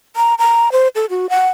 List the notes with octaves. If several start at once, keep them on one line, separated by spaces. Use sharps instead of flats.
A#5
A#5
C5
A4
F#4
F#5